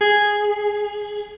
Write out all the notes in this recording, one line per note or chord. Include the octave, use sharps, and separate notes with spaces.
G#4